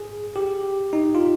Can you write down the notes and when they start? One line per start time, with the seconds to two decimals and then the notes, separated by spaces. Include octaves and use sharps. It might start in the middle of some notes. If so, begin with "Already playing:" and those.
Already playing: G#4
0.36 G4
0.93 D#4
1.15 F4